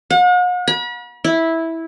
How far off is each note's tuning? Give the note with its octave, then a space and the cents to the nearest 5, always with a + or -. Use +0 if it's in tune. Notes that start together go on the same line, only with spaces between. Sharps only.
F#5 -45
B5 -40
E4 -10